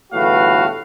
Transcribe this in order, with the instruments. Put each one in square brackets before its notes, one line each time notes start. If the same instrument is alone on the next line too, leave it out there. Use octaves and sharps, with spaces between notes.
[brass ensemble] G1 E2 A2 F#4 B4 F5